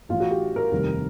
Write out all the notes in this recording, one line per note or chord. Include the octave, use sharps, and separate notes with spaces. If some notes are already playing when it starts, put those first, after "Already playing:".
A1 A2 E3 F4
F#4
G4
A#4
F1 D#2 D#3 G3